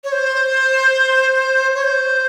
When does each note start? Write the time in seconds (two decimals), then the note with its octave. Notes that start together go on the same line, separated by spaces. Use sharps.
0.04 C#5
0.12 C5
1.75 C#5
1.84 C5